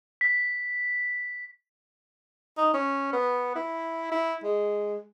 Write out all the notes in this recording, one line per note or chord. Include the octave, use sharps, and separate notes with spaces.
B6
D#4
C#4
B3
E4
E4
G#3